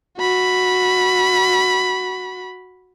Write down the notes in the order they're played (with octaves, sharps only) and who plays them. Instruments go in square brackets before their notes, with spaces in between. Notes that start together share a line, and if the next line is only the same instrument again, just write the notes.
[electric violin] F#4 B5